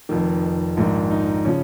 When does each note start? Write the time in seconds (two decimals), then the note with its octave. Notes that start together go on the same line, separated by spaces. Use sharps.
0.09 F1 F2 D#3
0.77 A#1 G#2 D#3
1.11 D#4
1.45 C#3 F3 C#4